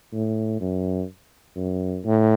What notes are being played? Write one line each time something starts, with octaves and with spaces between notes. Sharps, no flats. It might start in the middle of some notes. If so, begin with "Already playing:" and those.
A2
F#2
F#2
A2